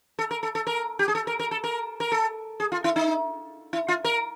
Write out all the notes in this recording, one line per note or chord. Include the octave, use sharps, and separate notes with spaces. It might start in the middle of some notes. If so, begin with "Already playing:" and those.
A4
A#4
A4
A4
A#4
G4
G#4
A4
A#4
A#4
A4
A#4
A#4
A4
G#4
F4
E4
D#4
E4
F4
A#4